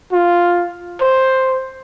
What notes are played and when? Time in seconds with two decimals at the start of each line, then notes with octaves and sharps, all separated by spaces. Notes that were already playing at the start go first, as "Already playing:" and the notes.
0.12 F4
1.01 C5